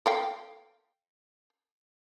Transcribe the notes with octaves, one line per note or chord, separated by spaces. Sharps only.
A4 F5 G5